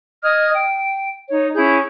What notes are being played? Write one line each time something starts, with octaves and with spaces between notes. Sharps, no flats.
D#5 D#6 F6 G#6
G5
D#4 C#5
C#4 E4 G#4 G6